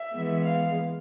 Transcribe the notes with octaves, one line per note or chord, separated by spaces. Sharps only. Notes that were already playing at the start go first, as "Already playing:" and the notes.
Already playing: E5
E3 G#3 B3
F5